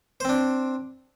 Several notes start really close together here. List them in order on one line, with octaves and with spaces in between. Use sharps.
C5 C4 D4